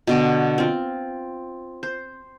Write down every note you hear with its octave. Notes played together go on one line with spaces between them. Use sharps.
B2 D3 G5
C4 F4
C5